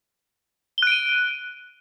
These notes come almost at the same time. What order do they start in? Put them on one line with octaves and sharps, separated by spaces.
G7 F#6 D7 D#7